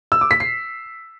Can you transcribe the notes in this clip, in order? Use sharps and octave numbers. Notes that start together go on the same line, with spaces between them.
E6
D6
B6
C7